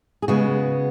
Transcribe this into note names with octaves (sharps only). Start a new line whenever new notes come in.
G#4
C#3 G#3 B3 F#4